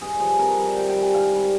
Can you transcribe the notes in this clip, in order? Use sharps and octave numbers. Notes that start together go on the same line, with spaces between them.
G2 G#4
F3 G#4
C3 A#4
G3
C3 G5
G5
G3
G#5
G#2 F5
G3